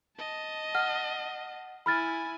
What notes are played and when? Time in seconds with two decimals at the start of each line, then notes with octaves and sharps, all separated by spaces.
0.17 D#5 A5
0.75 F#5 F6
1.86 E4 G#5 B5 F6 A6